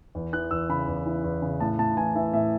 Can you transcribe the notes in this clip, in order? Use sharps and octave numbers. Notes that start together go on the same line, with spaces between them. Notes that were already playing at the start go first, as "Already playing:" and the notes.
E2
E3 F#6
E2 E6
C#3 B5
E2
E3
E2
C#3
A2 A5
A2 A5
E3 G#5
E3 E5
A2 E5